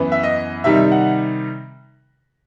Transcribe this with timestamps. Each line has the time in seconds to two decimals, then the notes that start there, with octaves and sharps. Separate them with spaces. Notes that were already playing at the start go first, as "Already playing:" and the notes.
Already playing: F#2 E3 B3
0.12 E5
0.23 D#5
0.64 C3 D#3 G3 D#4 E5
0.92 F#5